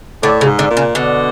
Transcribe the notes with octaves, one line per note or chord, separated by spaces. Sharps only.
A2 D3
C#3
G#2
D3
A#2
C#3
B2 D3